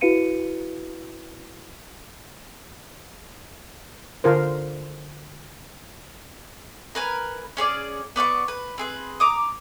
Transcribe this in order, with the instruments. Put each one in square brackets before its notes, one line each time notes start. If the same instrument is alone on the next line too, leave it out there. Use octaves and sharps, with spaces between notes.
[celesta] E4 F#4 B4 F5 C#7 D#7
[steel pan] D3 F4 A#4 C5
[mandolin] A#4 B4 G#5
C#4 G#4 C#5 D5
B3 D5 F5 C#6
B4
C4 G#4 B4
A#5 D6 D#6